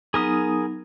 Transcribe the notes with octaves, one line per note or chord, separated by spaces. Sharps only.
F#3 B3 D#4 G#4 A#4 D#6